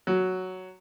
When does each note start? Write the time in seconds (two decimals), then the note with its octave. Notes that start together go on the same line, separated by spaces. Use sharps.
0.07 F#3